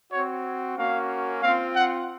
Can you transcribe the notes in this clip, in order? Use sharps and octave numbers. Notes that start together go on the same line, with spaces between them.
C4 F#4 C#5
A#3 C#4 F#4 F5
C4 F4 F5
F#5